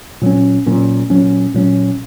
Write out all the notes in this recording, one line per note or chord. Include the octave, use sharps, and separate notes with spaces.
A#2 F#3 C#4
A#2 F#3 C#4
A#2 F#3 C#4
A#2 F#3 C#4